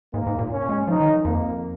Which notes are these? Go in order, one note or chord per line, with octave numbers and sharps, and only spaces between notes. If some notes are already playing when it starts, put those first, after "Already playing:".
G#2 A#3
G#2
A#2
C#4
G#3
F3 D#4
D#3
F2 A#3